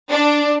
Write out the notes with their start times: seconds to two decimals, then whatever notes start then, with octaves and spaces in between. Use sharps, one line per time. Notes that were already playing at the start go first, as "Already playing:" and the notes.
0.11 D4